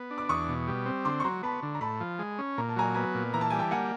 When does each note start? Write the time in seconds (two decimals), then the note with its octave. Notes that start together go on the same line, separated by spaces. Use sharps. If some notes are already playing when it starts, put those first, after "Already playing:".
Already playing: B3
0.11 D4
0.18 D6
0.29 E2 C#6 D#6
0.48 B2
0.68 G3
0.86 C4
1.05 D3 C6 D6
1.20 C#6
1.24 F#3 A#5 C6
1.43 B3 A5 B5
1.63 D3
1.75 A#5
1.81 A2 A5 B5
2.00 F3
2.19 G#3
2.39 C#4
2.58 A#2 A#5
2.69 A5
2.76 F#3 G#5 A#5
2.95 B3 G#5 A#5
3.15 A#2
3.34 E3 A#5
3.41 A5
3.50 G3 G#5
3.59 G5 A5
3.71 A#3 F#5 G#5